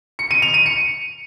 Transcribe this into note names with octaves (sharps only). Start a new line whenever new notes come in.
C#7
D#7
F7
D#7
C#7